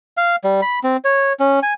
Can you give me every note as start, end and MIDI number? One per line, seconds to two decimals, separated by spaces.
0.17 0.36 77
0.44 0.61 55
0.62 0.79 83
0.84 0.97 60
1.04 1.33 73
1.40 1.60 61
1.63 1.74 80